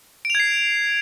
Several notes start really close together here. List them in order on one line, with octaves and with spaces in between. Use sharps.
D7 F7 G#6 C7